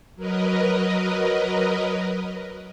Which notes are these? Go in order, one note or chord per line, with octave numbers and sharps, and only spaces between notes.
F#3 A#4 B4 D#5